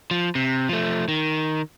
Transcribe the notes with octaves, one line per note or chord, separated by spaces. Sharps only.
F3
C3
F3 A3
D#3